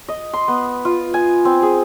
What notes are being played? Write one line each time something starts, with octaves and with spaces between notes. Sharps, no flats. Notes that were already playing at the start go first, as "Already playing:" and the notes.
D#5
C6
B3
F4
G#5
C4
G#4